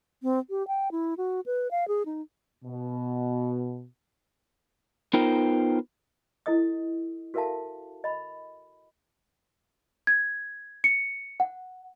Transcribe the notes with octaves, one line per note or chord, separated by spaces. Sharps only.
C4
G4
G5
E4
F#4
B4
F5
G#4
D#4
B2
B3 D#4 F4 A#4 C5 G5
E4 A4 D#5 D#6
F#4 A4 A#4 E5 F5 A5
D#5 B5
G#6
C#7
F#5